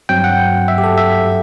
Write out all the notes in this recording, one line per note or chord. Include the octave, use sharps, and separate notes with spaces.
G2 F#3 C4 G5
F#5
E5
G4
A4
E5